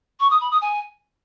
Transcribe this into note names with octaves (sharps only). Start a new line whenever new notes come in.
C#6
D#6
B5
D#6
G#5